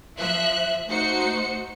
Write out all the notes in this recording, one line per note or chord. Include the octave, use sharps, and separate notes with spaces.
F3 E5 F#6
A3 D#4 F#4 C5 C#7